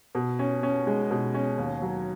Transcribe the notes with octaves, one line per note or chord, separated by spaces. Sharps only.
B2
C#4
C#4
G#3
B2
C#4
D#2
F#3